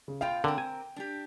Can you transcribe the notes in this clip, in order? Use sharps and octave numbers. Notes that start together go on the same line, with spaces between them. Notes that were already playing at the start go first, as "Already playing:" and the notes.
C#3
B2 F4 F5 G5
D3 C4 A#4 G5
G#5
D4 G4